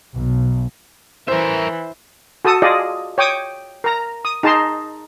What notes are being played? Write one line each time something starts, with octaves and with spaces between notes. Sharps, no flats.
B1
E3 A#4 C5 E5
F#4 A4 A5 D#6
F4 G#4 D5 D#5
C#5 G5 D6 D#6
A#4 A#5
D#6
D#4 G#4 A5 A#5 C6